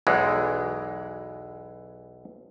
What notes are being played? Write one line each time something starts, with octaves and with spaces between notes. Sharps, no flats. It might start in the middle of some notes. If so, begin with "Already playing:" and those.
B1 E2 E3 G#3